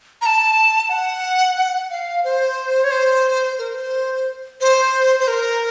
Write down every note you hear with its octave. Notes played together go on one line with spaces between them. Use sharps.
A#5
A5
F#5
F5
C5
C#5
C5
A#4
C5
C5
C5
A#4